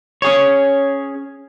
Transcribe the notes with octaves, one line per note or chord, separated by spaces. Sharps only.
C#4 G#4 C#5